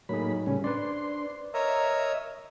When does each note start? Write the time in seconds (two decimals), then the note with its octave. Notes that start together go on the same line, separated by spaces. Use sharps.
0.09 A2 F#3 A#3 D#4 G#4 B5
0.46 A2 C#3 G3 C#4
0.64 D4 B4 C5 D5 C6
1.54 A#4 C#5 D#5 E5 A#5